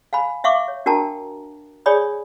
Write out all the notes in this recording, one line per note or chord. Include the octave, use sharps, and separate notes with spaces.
F5 G#5 B5
E5 F5 C#6 D6
C#5
D4 F#4 A#4 G5 A5 A#5
G#4 C#5 D5 G#5 B5 D#6